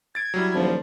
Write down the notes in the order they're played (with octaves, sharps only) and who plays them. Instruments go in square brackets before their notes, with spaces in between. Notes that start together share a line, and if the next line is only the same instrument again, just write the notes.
[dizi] G#6 [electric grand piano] A6 D7
[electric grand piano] F#3 G3 E4
[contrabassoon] D#1 [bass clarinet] F3